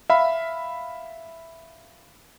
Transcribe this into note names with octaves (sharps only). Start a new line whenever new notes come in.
E5 F5 B5